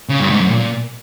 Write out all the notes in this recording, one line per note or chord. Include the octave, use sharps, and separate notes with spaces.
C#3
G2
G#2
F#2
A#2